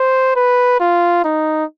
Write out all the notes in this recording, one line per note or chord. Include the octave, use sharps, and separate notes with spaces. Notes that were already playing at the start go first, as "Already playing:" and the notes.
Already playing: C5
B4
F4
D#4